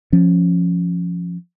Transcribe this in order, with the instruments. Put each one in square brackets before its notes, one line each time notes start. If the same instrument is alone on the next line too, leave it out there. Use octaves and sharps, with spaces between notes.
[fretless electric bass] F3 C#4